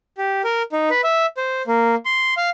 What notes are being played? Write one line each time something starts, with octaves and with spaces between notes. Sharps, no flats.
G4
A#4
D#4
B4
E5
C5
A#3
C6
F5